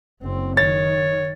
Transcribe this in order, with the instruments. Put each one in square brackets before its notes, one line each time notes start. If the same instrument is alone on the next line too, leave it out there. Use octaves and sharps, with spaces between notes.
[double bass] F#1 C4
[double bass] D#3 [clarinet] C#5 [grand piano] A6